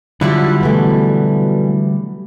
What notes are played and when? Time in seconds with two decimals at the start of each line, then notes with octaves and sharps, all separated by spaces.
0.21 D3 F#3 G3 E4 F4
0.61 B2 E3 A3